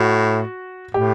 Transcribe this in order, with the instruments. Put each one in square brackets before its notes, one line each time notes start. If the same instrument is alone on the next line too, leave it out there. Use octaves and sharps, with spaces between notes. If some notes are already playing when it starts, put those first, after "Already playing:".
Already playing: [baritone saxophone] A2 [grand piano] F#4
[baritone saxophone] A2 [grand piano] G4